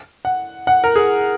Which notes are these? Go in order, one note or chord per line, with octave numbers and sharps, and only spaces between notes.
F#5
F#5
A#4
G#4